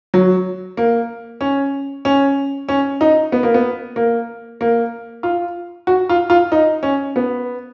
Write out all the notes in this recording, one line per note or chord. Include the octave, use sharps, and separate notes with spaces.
F#3
A#3
C#4
C#4
C#4
D#4
B3
A#3
B3
A#3
A#3
F4
F#4
F4
F4
D#4
C#4
B3